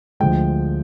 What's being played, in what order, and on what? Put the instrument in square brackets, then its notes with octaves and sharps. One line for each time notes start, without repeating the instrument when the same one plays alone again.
[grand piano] D2 D3 F3 G#3 G5